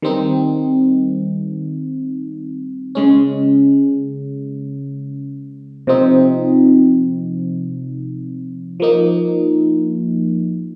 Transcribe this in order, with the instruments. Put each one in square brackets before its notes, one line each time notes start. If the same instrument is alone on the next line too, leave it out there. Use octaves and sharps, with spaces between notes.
[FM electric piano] D#3 G3 C4 D#4
C#3 G#3 C#4
C3 F3 C4 D#4
F3 A#3 D#4